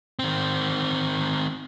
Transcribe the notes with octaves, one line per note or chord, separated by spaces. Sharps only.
D#3 C4